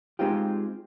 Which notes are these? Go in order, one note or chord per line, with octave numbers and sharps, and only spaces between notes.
G#3 C4 D#4 F4 G4